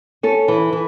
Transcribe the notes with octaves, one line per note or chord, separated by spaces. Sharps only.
C#4 A4
E3
E3